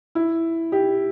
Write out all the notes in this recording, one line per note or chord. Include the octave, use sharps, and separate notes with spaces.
E4
G4